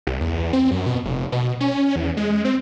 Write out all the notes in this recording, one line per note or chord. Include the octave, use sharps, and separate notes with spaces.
C2
E2
C4
F#2
B2
F1
B2
C#4
E2
G#3
C4